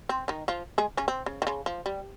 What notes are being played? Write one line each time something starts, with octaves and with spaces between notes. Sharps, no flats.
C4
D#3 D#4
F3 F4
G#3 G#4
C#3 C#4
C4
C#3
D#3
C#3
F3
G3